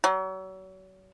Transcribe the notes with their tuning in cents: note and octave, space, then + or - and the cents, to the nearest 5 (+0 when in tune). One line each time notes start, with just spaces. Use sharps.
F#3 +35